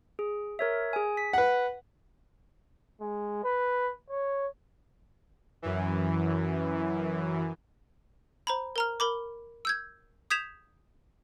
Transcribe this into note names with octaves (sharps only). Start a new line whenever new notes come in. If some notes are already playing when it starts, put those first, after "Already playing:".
G#4
A#4 C#5 E5
G#4 G#5
B6
B4 F#5
G#3
B4
C#5
F#2 E3
C5 A#5 B5
A#4 A#5 F6
A#4 B5 D6
E6 G6 G#6
D#6 G6 G#6 B6 E7 F7